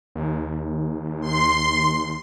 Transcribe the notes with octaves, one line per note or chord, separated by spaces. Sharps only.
D#2
C6